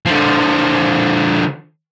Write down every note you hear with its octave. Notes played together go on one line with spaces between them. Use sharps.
D3 F3